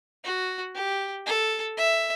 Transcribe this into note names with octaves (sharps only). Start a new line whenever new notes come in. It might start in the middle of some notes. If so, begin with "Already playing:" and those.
F#4
G4
A4
E5